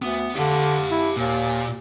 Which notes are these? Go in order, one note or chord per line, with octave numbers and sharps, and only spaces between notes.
D2 B3
D3 G4 F5
E4
D#2 A#2